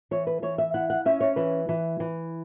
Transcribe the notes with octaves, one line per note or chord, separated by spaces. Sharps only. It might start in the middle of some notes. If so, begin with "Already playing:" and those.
E3 C#5
B4
E3 C#5
E5
E4 F#5
F#5
C#4 E5
C#5
E3 B4
E3
E3